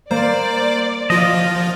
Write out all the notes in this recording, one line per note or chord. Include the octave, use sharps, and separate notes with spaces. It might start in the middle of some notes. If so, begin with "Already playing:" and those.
A#3 C5 D5
F3 F4 D#5